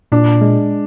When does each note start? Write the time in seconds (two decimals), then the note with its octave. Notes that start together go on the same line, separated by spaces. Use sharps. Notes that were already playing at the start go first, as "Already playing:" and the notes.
0.12 A#2 D4
0.41 G#3